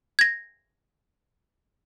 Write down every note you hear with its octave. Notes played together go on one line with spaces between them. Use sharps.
G#6 A#6